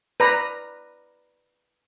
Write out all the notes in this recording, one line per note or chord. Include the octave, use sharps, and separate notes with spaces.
B4 D5 A#5